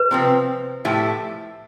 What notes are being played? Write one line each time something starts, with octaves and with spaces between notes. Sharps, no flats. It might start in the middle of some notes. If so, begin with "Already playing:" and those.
Already playing: B4
C3 F3 C4
A2 F3 A3 E4 G4